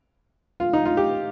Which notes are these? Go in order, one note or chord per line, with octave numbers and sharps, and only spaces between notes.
F4
D#4
F4
G4